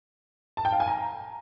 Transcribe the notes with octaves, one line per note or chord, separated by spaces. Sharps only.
A5
G5
F5
G#5
A#5